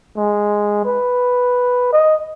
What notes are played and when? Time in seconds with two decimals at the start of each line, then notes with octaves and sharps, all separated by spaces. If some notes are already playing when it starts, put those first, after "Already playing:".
0.17 G#3
0.85 B4
1.93 D#5